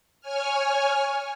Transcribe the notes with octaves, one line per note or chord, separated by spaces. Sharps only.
C#5 G#5 F6